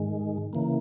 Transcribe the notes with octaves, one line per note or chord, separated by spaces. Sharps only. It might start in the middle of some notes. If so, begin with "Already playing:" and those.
Already playing: G#2 D#3 G#3
C#3 E3 A#3